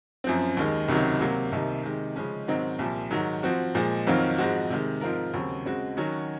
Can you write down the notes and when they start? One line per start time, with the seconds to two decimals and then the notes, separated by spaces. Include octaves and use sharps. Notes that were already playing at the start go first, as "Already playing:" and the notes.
0.24 F#2 F3 C4
0.57 D#2 D#3 G#3
0.88 C#2 C3 D#3 F#3
1.21 C3 F#3 A#3
1.52 C2 C3 D#3 A#3 D#4
1.84 C3 D#3 G#3
2.16 C#3 F3 G#3 C#4
2.48 G#2 D#3 F#3 C4 D#4
2.79 C2 A#2 F3
3.11 G#2 D#3 F#3
3.43 F3 C4 F#4
3.75 A#2 F3 G#3
4.07 F2 D#3 F#3 C4 F4
4.38 G#2 F3 G#3 C4 F#4
4.70 C3 D#3 G#3
5.01 G#2 F3 C4 F4 A#4
5.34 D#2 C#3 F#3 C4
5.65 C#3 G#3 C4 F#4
5.97 D#3 F#3 C#4 F#4 C#5